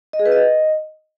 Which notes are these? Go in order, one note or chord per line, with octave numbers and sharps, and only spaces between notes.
D#5
G#4
B4
D#5